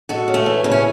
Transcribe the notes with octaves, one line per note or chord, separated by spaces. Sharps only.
G#3 F#4 A4
C#3
A3 C#4
E3
C#3
C#4